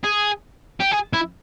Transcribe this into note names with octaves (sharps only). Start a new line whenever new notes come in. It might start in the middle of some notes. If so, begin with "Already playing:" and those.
G#4
G4
G#4
E4